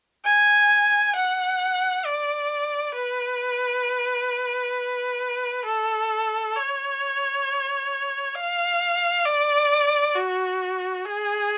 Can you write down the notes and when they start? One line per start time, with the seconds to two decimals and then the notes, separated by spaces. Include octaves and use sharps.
0.25 G#5
1.16 F#5
2.06 D5
2.95 B4
5.65 A4
6.56 C#5
8.35 F5
9.26 D5
10.16 F#4
11.05 G#4